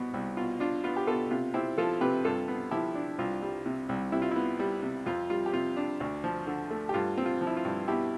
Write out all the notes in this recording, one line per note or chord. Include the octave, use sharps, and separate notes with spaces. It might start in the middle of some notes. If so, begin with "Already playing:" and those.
Already playing: C2 B2 B3
C2
B2 F4
D4 F4
B3 F4
G4
B2 F4 A4
C3 F4
C4 E4 G4
F3 F4 A4
C3 G4 B4
G2 F4 A4
B3
F3 E4 G4
D4
C2 F4
G3
C3
C2
C3 E4
F4
B3 E4
G3
C3
F2 F4
G3 F4
G4
C3 F4
D4
D2
F3
D3
A3
G4
G2 F4
C4
F4
F3
E4
F4
G2
B2 E4 G4